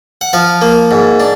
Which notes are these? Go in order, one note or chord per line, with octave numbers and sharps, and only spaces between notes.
F#5
F3 F5
A#3
G#2
D4